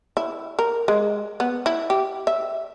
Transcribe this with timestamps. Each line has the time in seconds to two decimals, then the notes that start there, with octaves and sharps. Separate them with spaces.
0.17 E4
0.59 A#4
0.88 G#3
1.40 B3
1.66 E4
1.90 G4
2.27 E5